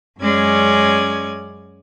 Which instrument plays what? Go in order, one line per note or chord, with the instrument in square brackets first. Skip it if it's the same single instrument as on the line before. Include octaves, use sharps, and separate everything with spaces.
[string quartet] F#2 G#3 C#4 D5 G#6